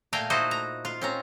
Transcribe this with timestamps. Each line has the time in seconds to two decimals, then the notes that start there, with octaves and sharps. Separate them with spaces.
0.13 A#2 A3 F5 G5 G#5 A#5
0.30 D#4 E4 F#4 C5 D#5
0.51 A#5
0.85 F4
1.01 C4 C#4 A#5